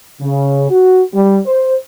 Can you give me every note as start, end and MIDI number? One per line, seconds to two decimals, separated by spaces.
0.21 0.68 49
0.70 1.02 66
1.14 1.38 55
1.46 1.75 72